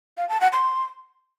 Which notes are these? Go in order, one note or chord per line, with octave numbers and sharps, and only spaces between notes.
F5
A5
F#5
C6